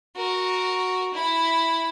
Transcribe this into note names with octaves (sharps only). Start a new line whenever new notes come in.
F#4 A#4
E4